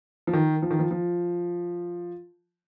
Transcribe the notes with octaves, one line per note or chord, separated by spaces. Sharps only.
F3
D#3
F3
D#3
F3
F3